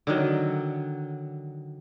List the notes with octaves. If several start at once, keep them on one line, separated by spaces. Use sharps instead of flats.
D3 D#3 F#3